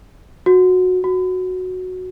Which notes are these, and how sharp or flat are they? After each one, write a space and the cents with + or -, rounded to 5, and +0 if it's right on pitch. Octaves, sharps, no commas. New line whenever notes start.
F#4 -15
F#4 -5